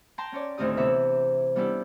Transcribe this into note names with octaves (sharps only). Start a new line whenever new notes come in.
G5 A5 A#5 C6
C#4 C#5 D5
D2 A2 D#3 C4 G4 D#6
C3 E3 B3 E5
G3 B3 C#4 D4 E4 G4